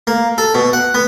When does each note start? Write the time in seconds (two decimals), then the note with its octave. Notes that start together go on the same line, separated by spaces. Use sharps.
0.07 A#3
0.38 A4
0.54 B2
0.73 F#5
0.94 B3